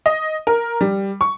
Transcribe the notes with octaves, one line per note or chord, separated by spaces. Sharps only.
D#5
A#4
G3
C#6